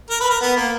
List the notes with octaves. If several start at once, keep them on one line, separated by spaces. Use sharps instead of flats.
A#4
B4
A#4
B3
A#3